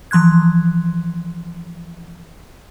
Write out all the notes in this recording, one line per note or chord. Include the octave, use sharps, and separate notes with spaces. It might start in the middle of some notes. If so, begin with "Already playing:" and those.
E3 F3 C6 F#6 G#6